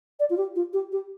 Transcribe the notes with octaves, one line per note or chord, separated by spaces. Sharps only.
D5
F4
G4
F4
G4
G4